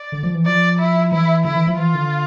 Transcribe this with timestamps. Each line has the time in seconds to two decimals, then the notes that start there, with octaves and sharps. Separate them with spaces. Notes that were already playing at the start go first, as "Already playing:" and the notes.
Already playing: D5
0.12 D3
0.23 F3
0.34 E3
0.45 F3 D5
0.79 E4
1.11 E3 E4
1.44 D3 E4
1.56 E3
1.67 F3
1.78 E3 F4
1.95 D3